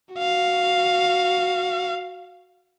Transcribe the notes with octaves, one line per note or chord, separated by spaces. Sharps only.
F#4 F5